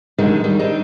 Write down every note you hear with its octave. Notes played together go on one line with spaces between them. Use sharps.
D3 D#3 F#3 G#3 A3 D#4
D#3 G3
C4 D4 D#4